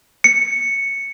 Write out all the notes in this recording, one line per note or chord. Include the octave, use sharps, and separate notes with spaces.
C#7